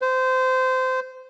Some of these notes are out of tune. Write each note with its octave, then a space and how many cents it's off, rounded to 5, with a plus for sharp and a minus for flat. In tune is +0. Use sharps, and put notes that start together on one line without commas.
C5 -20